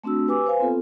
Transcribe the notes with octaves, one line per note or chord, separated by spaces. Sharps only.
A3 C4 D4 F#4 E6
G4 B4 G#5 D6 E6
B4 C5 F5 G#5
B3 C4 F4 A4